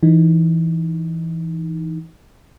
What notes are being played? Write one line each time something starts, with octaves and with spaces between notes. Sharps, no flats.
E3 D#4